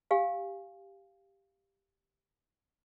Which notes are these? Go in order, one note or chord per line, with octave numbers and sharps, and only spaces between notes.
G4 F5 G#5